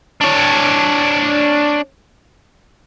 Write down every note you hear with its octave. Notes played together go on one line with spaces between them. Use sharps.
D4 C#5